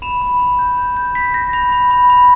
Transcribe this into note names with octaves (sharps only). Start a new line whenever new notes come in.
B5 E7
B5
B5
G6
G6
G6
B5 B6
G6 A#6
B5 A#6
B5
B5
B5